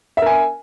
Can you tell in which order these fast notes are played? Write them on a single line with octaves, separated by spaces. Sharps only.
E5 A#4 G#5